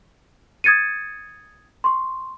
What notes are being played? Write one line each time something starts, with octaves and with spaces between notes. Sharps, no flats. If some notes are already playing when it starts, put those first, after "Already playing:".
D#6 G#6 A6 C#7 D#7
C6 C#6